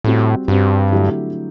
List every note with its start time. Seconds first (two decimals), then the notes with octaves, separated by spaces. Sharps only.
0.04 A2 G3 C4 F#4
0.48 G2 G3 C4 F#4
0.92 D3 F#3 A3 E4 G4